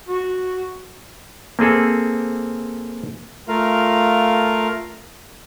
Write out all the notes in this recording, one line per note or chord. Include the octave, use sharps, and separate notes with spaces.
F#4
A#3 C4 G#4 A4
A3 F4 A#4 F5